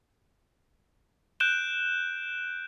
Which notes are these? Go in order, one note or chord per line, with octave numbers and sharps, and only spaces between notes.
F#6 G6 D7 E7 G7